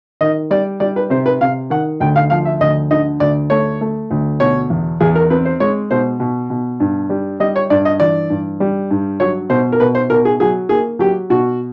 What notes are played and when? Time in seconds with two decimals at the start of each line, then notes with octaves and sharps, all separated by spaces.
0.21 D#3 D#5
0.50 G3 D5
0.80 G3 D5
0.96 B4
1.10 C3 C5
1.26 B4
1.41 C3 F5
1.70 D#3 F#5
2.00 D2 G5
2.16 F5
2.30 F3 F5
2.45 E5
2.60 D2 D#5
2.91 D3 D#5
3.20 D2 D5
3.50 A3 C#5
3.81 A3
4.11 D2
4.40 B2 C#5
4.70 E2
5.00 E2 G#4
5.15 A#4
5.30 C4 B4
5.45 C5
5.60 G#3 C#5
5.91 B2 C5
6.20 B2
6.50 B2
6.80 G2
7.10 G3
7.40 G3 D#5
7.56 C#5
7.70 G2 D5
7.85 D#5
8.00 E3 D5
8.30 G2
8.60 G3
8.91 G2
9.20 F#3 C#5
9.50 B2 C5
9.72 A#4
9.80 B2 B4
9.95 C5
10.10 B2 A#4
10.25 G#4
10.40 F#3 G#4
10.69 A#3 G#4
10.99 F#3 G4
11.30 B2 F#4